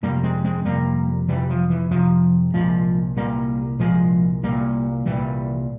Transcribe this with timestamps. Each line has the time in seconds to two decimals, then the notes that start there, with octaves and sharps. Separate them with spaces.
0.03 F2 C3 G3 A#3
0.23 G#3 C4
0.44 G#3 C4
0.65 F2 C3 G3 A#3
1.28 F2 C3 E3 G3
1.50 F3
1.70 E3
1.91 F2 C3 F3
2.54 C2 A#2 F3 G#3
3.16 C2 A#2 G3 A#3
3.79 C2 A#2 F3 G#3
4.43 C2 A#2 G3 A#3
5.06 C2 A#2 E3 G3